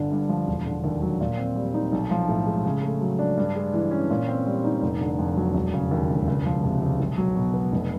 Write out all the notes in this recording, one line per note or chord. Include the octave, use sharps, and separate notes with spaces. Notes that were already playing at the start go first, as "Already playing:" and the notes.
Already playing: G1 D3
G2
F3
E1
D3
D#2
F#3
A#2
C4
G3
D#4
B1
F3
A2
G#3
C#3
A3
F#3
D4
G2
G#3
E3
C#4
A#2
C4
G3
D#4
F1
D3
F2
F#3
E1
C#3
D#2
E1
C#2
F3
C3
C#2
B1
F#3
B2
B3
F1